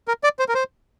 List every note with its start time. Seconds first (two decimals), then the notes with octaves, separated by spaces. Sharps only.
0.08 A#4
0.24 D5
0.39 C5
0.49 A#4
0.54 C5